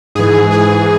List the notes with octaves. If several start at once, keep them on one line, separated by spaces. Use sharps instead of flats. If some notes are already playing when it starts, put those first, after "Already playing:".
G#2 E3 G#4
G#4